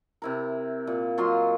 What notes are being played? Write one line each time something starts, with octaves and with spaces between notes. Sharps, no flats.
C3 E4 A#4
A#2
F#3 F4 D#5 C6